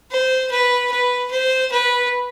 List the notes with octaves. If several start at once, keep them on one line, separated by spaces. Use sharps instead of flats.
C5
B4
B4
C5
B4